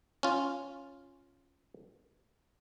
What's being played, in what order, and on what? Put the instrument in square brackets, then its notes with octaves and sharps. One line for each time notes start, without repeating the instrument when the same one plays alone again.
[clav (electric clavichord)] C#4 F4